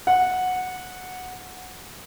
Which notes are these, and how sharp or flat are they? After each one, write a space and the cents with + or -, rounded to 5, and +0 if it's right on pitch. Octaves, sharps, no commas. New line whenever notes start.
F#5 -10